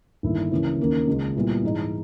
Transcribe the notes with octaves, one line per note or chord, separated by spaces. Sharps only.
G1 G2 D#3 A#3 E4
C#2 C#3 E3 A#3 C#4
D#2 D#3 A#3 C#4
C#2 C#3 G#3
A#2 G3 B3 E4
G#2 E3 G#3 D#4